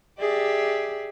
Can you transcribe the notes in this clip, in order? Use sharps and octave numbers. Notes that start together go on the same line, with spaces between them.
G4 G#4 D5 E5